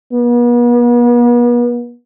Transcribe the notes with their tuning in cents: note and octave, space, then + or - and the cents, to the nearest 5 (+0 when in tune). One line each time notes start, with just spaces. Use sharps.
B3 -40